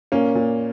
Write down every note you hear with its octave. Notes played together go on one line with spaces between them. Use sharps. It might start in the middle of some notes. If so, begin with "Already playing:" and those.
A#2 A#3 C#4
A#2